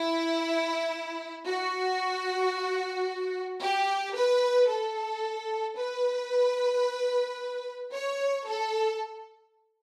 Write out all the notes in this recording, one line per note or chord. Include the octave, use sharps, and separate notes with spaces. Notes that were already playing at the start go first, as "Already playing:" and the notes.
Already playing: E4
F#4
G4
B4
A4
B4
C#5
A4